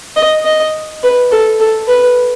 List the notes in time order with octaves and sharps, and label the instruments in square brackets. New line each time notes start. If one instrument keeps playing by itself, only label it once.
[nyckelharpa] D#5
D#5
B4
A4
A4
B4